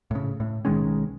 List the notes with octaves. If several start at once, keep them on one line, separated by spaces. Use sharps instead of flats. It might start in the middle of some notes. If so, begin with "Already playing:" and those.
A2 C#3
A2
B1 D#3 G#3 C#4